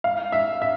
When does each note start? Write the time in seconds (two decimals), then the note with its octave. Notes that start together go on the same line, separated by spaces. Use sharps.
0.04 F5
0.32 E5
0.62 E5